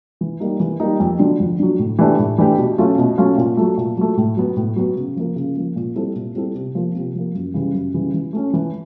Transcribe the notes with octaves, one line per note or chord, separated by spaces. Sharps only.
E3
G3 A#3 D#4
E3
G3 A#3 D#4
F2
D3 F#3
F2
D3 F#3
A2
E3 A3 D4 G4
A2
E3 A3 D4 G4
B2
F#3 A3 C#4 F4
B2
F#3 A3 C#4 F4
A#2
F#3 A3
A#2
F#3 A3
A2
F#3 B3
A2
F#3 B3
C#3
F3 A#3
C#3
F3 A#3
A#2
G3 C4 E4 A4
A#2
G3 C4 E4 A4
C3
F3 A#3
C3
F3 A#3
F#2
C#3 E3 G3
F#2
C#3 E3 G3
E3
A3 C#4
E3